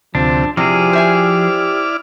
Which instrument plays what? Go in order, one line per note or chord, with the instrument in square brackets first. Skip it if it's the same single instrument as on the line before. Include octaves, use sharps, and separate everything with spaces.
[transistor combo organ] D2 C3 [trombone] F3 [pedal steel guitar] D4
[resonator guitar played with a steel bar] C3 [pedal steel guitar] F3 G#4 [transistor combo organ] E4 D5 F6 [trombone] G4
[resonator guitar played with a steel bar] C5 E5 G#5